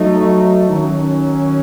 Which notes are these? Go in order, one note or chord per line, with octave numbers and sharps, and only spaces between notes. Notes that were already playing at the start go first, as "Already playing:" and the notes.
Already playing: F#3 A3 D#4
D#3 F#3 C#4